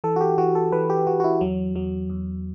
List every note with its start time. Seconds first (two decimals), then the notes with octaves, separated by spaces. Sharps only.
0.04 E3 A4
0.16 F#4
0.21 G4
0.38 E3 F#4
0.55 A4
0.72 E3 B4
0.90 G4
1.07 E3 F#4
1.20 F#4
1.24 E4
1.41 E2 F#3
1.75 E2 F#3
2.10 E2